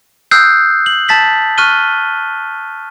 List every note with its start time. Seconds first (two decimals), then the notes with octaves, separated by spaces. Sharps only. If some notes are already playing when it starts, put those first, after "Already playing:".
0.31 D#6 E6 F#6 G6 C7
0.86 F#7
1.08 A5 A6 B6 F#7
1.58 C#6 F6 F#6 D#7 G7